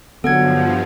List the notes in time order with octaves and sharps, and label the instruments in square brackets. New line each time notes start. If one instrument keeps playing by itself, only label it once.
[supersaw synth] G2 F3 [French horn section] D3 F#3 [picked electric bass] B3 [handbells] A4 F#5 G#6